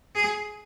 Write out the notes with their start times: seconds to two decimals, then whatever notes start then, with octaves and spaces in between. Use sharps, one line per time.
0.15 G#4